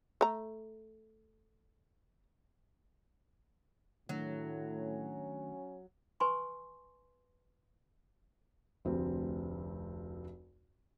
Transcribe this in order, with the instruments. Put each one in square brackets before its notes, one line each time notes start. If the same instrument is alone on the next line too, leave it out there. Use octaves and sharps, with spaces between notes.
[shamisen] A3 A#5
[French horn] A2 [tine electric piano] D#3 A3 D4 [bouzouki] F#3
[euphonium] C#4
[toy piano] B4 G#5 C6 C#6
[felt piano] F1 D2 C4